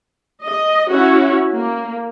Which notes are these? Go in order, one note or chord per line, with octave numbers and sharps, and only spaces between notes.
D#5
C#4 E4 F#4
A#3